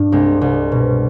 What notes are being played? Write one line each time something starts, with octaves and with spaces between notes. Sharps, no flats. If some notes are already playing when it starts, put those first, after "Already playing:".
Already playing: G2 D4
C2 G#3 C4
C2
B2